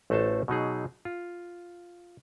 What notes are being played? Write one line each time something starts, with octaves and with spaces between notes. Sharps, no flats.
A1 A3 F#4 A4 C5 A5
B2 F#3 D#4 G#4
F4